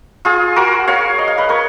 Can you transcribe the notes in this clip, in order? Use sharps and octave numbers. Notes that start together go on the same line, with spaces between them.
F4 G#4
F#4 A#4
C#5 F5
D#5
F5
B4 D#5
A#4 C#5